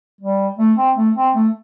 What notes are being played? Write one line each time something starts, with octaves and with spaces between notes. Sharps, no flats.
G3
A3
C4
A3
C4
A3